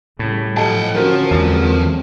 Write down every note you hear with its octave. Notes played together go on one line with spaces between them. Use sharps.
A2 C#3 G3
G#2 F3 F#3 A4 D#5 F#5 G5 A5
D3 F3 C4 C#4 F#4 A#4
E2 D3 F#3 G#3 C4